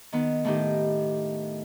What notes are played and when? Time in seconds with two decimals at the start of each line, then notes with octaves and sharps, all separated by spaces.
0.12 D#3 B3
0.45 A2 D#3 G4